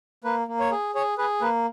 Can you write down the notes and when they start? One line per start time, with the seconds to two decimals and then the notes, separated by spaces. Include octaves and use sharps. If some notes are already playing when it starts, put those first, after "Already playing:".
0.24 A#3 B4
0.48 A#3
0.60 C#5
0.72 G#4
0.95 G#4 C#5
1.18 G#4 B4
1.42 A#3 B4